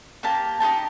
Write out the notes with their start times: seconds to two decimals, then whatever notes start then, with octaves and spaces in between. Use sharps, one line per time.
0.23 A#3 G4 A5
0.60 D#4 F4 G4 A5